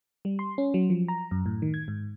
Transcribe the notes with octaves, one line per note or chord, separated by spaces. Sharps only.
G3
C6
C#4
F#3
F3
A#5
F#2
A2
D#3
G#6
G#2